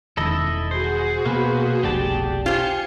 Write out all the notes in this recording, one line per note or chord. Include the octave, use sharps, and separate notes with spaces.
E1 D#3 E4 A4 D#5
F#4 G#4 C5
B2 A#3 B4 C5
F1 B1 G4 D5 A5
F4 G4 C5 G#5 C#7